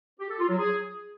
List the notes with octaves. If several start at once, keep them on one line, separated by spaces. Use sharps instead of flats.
G4
A4
F4
F#3
G#4